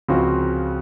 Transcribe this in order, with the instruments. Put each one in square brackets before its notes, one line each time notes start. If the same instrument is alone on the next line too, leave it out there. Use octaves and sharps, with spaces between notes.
[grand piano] C#2 C#3 F3 C4 F#4